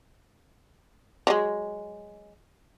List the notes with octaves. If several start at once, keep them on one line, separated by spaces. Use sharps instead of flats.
F3 F#3 G#3